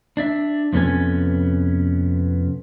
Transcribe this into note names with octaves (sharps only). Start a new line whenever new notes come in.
D4 D5 E5
F2 C3 B3 C#4 A4 G#5